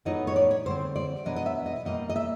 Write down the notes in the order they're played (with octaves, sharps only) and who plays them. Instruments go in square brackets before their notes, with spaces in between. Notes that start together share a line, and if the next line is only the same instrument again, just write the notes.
[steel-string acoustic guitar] A2 F#3 B3 D#4 D#5
C#5
D5
C#5
D3 G3 C4 C5
D5
B2 F#3 B3 D4 D#5
D#5
E5
D#5
B2 G3 A#3 D#5
D#5
E5